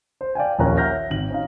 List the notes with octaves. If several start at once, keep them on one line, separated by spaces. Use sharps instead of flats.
C5
D5 F5 G5 G#5
A#1 D#2 C#4 A#4 A#5 F#6
E5 F#5 A#5 F6 G6 A#6
G#1 F#7
C#4 D#4 F5